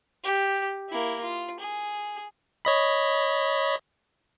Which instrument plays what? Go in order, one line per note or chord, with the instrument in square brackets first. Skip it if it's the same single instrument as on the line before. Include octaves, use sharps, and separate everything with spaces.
[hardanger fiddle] G4
A#3 E4
F4
G#4
[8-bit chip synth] C#5 D#5 B5